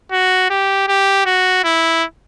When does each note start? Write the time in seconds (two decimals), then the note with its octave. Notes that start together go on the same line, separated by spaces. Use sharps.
0.12 F#4
0.50 G4
0.88 G4
1.26 F#4
1.64 E4